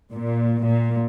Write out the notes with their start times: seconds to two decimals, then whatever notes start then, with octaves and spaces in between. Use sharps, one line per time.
0.11 A#2
0.64 A#2